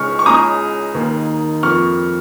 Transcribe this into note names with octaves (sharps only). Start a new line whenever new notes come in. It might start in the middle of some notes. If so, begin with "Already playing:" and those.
Already playing: C#2 C#3 G#3 C#6 F6
C#6
C#2 C#3 G#3 A#5 D#6
D#2 D#3 A#3
F2 F3 A#3 C#6 F6